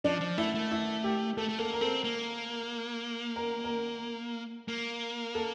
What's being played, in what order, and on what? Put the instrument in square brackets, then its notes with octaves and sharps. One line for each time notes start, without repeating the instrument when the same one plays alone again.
[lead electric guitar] F3 [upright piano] D4
[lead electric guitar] F3
[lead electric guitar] A3 [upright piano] E4
[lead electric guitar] A3
[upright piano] E4
G4
[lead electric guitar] A3 [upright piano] A4
[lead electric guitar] A3
[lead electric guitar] A#3 [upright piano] A4
[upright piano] A#4
[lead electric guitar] C4 [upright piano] A4
[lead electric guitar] A#3
[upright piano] A#4
A#4
[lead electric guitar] A#3
[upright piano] A4